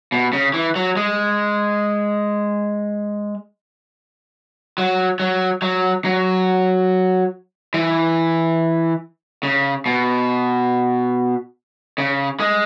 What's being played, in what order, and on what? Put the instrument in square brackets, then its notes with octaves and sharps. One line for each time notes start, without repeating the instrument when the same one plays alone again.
[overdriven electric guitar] B2
C#3
E3
F#3
G#3
F#3
F#3
F#3
F#3
E3
C#3
B2
C#3
G#3